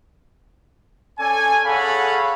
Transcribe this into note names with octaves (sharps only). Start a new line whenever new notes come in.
C#4 A4 D5 G#5
G#4 A4 C#5 F5 F#5 B5